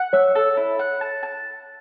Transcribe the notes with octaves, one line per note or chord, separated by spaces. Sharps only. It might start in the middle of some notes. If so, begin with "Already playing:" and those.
Already playing: F#5
C#5 E5
A4
E4
F#5
A5
A5